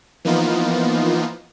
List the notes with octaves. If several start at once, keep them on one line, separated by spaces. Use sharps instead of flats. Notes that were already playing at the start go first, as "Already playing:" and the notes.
E3 F3 A#3 B3 D#4 F4